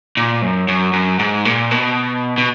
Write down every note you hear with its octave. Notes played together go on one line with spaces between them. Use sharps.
A#2
F#2
F#2
F#2
G#2
A#2
B2
B2